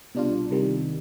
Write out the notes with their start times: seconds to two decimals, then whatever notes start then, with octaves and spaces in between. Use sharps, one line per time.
0.15 C2 B2 G3 D4 F4
0.50 C2 C3 D#3 G3